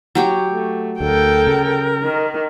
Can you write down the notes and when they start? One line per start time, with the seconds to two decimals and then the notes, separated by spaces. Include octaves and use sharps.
0.15 F#3 G4 C#5
0.48 A3
1.00 D2 A4 A#4 G5
1.47 C#3
2.03 D#3